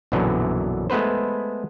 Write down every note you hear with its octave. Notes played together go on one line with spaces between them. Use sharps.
A#1 F#2 B2 D3 E3 F#3
G#3 A3 B3 B4 C5